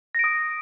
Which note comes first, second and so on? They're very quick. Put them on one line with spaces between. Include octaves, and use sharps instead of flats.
A#6 D7 D#6